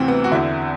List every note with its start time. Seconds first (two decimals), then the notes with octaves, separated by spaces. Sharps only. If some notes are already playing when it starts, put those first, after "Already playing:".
Already playing: D2 C3 E3 C4
0.08 B3
0.24 F#4
0.32 E2 D3 E4